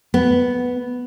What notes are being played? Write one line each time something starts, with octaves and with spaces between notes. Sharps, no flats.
B3